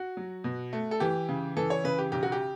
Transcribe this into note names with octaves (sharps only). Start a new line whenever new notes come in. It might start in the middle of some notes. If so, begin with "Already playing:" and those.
Already playing: F#4
F#3
B2
A3
A4
E3 G4
C#3
E3 A4
C#5
C#3 B4
G4
B1 G4
F#4
G4